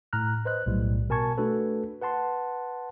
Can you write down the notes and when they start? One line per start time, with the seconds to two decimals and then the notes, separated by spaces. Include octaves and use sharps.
0.13 A2 A#5 F6 F#6
0.45 B4 C5 D#5 F#6
0.66 B1 A2 G3
1.09 B2 A#4 G#5 A5 C#6 G#6
1.38 A3 D4 F#4 A4 B4
2.01 B4 F#5 A5 C6